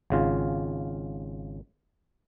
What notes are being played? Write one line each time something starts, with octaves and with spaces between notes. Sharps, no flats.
G#1 C#3 F4